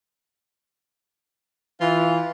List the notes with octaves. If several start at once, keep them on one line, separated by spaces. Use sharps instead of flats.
E3 F4